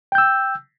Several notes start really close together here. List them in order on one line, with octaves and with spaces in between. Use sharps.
G5 G6 E6